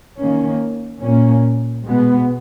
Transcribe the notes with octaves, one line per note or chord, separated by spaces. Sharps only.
D#3 A#3 C#4
A#2 A#3 C#4
B2 G#3 B3